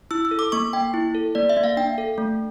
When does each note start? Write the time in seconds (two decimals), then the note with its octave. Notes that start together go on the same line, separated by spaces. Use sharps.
0.11 E4 E6
0.25 E6
0.31 A4
0.39 D6
0.52 A#3 C#6
0.73 A#3 G5
0.94 E4
1.15 A4
1.35 A#3 D5
1.49 E5
1.57 A#3
1.64 F5
1.77 D4 G5
1.98 A4
2.18 A3